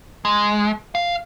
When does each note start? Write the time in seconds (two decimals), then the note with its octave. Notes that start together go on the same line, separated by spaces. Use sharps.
0.25 G#3
0.95 F5